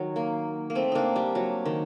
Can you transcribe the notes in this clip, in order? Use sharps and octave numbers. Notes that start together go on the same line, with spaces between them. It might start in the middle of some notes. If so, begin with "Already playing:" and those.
Already playing: D#3 F#3
A#3
A#3
A3 C4
A#3 D4 D#4
G3
F#3
D#3